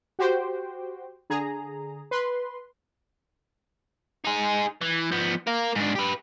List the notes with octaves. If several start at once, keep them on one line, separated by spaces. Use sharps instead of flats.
F#4 G4 C5 G5
D3 G#4 A#5
B4 C6
D#4 G#4
E3
F3 B3
A#4 F5
G#2 D4
G4 B4